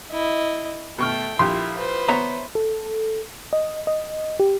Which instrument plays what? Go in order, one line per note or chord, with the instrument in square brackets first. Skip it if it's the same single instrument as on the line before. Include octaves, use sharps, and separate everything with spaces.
[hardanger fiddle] E4 D#5
[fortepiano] B2 C#6 F6 [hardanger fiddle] A3 G5
[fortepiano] A#1 F4 G4 [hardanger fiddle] E4 [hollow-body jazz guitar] C6
[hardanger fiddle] B4 C5
[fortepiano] B3 [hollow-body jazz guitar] C#5 E5 A#5
[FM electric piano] A4
D#5
D#5
G4